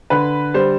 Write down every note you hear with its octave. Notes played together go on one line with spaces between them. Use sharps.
D3 B4
G3 C5